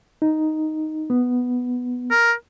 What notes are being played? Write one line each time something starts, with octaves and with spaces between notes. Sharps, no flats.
D#4
B3
A#4